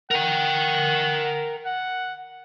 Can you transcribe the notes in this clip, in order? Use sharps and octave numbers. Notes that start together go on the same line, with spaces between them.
A#4 F#5 G5
F#5